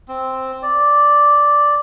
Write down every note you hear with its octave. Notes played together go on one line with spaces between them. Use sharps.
C4
D5